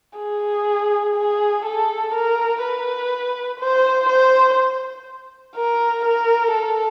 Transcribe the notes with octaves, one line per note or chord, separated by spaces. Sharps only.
G#4
G#4
A4
A#4
B4
C5
C5
A#4
A#4
A4